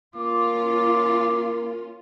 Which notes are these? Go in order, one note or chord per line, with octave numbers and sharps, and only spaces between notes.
A#3 C#4 F4 D6